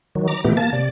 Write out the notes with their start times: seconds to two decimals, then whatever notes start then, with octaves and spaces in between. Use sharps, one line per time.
0.15 D#3 F#3
0.28 A#5 D6
0.44 A#2 E3 A3 B3 G4
0.57 A#3 A5 A6
0.73 C3 D5